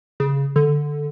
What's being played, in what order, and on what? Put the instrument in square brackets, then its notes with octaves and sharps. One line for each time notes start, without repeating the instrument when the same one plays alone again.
[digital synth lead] C#3
D3